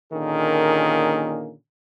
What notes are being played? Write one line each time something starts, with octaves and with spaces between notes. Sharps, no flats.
A#2 D3 D#3 A#3 C#4 G#4